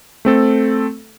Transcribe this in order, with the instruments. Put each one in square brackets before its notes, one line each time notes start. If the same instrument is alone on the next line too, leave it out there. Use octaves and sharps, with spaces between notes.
[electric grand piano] A3 C4 A4